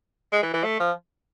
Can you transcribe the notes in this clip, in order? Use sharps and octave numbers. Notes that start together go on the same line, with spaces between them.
G#3
E3
E3
A3
F3